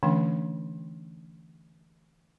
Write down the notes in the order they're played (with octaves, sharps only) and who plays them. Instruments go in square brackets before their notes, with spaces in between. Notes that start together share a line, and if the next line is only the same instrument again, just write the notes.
[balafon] D3 E3 A3 C#4 D4 G5